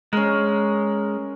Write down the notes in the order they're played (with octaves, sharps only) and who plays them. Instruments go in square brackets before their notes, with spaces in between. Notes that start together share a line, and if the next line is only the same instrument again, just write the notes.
[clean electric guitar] G#3 [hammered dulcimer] C#4 A#4